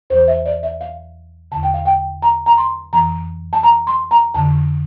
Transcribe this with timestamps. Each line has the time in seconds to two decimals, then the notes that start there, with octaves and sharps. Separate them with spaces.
0.10 E2 E3 C5
0.28 E5
0.46 D5
0.63 E5
0.81 F5
1.51 E2 D3 A5
1.63 G5
1.74 F5
1.85 G5
2.22 A#5
2.46 A#5
2.58 C6
2.93 F2 E3 A#5
3.53 A5
3.63 A#5
3.87 C6
4.11 A#5
4.34 F2 D3 A5